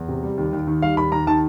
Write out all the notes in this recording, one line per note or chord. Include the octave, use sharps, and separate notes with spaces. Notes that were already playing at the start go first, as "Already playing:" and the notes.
Already playing: E2
C3
G3
D#2
D#2
D#3
G3 F5
D#2 B5
D#2 A#5
D#3 A5